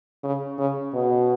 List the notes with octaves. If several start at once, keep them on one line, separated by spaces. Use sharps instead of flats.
C#3
C#3
B2